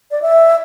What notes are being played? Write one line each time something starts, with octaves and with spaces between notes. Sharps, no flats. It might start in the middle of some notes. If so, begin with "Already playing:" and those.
D5
E5